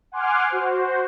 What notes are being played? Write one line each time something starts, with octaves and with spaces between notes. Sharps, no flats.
F#5 G#5 C6 D6 F6
F#4 C5